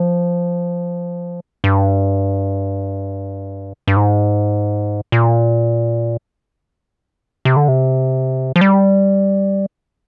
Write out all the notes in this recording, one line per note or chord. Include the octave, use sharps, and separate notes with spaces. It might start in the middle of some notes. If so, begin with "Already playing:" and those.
Already playing: F3
G2
G2
G#2
A#2
C3
D3
C3
F3
G3